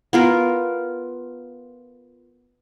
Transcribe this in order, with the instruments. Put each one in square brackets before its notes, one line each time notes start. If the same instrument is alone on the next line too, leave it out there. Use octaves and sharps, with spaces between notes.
[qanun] B3 F4 A#4